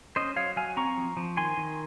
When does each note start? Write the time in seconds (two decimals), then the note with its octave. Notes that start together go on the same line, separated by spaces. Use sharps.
0.16 C#4 C5 D#5
0.36 F#3 C#5 F5
0.56 F#3 F5 G#5
0.77 C4 A#5 C#6
0.97 F3
1.17 F3
1.37 D#3 G#5 C6
1.57 D#3